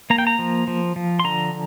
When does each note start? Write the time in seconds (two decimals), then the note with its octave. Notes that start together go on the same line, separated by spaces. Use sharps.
0.10 A#3 A#5
0.18 G5
0.27 A#5
0.39 F3
0.67 F3
0.96 F3
1.20 C6
1.24 D3 A#5